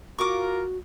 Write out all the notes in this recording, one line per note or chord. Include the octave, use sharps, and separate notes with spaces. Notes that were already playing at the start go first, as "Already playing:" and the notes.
F4 F#4 A#4 C#6 D6